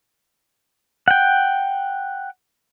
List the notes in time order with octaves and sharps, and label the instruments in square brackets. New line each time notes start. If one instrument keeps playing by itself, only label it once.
[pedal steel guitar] F#5 G5